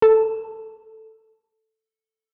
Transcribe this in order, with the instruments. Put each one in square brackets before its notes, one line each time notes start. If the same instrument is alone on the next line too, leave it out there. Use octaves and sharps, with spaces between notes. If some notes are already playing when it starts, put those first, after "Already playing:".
[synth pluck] A4